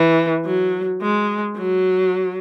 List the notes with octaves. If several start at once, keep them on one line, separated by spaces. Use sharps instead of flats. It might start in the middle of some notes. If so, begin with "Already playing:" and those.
Already playing: E3
F#3
G#3
F#3